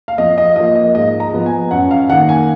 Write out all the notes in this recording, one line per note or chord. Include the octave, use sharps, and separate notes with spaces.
F5
F2 D#5
D#5
F3 A#3 D#5
D#5
G#2 D#5
A#5
F3 B3
G#5
F#2 F#5
F5
D#3 A#3 F#5
G#5